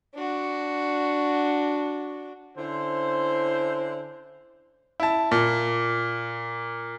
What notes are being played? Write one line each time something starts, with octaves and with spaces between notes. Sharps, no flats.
D4 F#4
D3 C#4 E4 C5
E4 A5
A#2